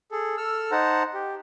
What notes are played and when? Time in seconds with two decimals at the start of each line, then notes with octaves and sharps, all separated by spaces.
0.12 G#4 A4
0.37 A4 E6 F6
0.71 D#4 C5 F#5 A5 A#5
1.14 G4